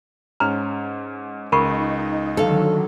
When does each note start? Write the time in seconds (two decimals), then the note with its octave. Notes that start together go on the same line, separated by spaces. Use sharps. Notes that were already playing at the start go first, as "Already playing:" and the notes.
0.40 G#2 C#4 A#5 F6
1.52 C#2 D#4 A#4 B5 C#6 C7
2.37 D3 D#3 F#3 A4 F5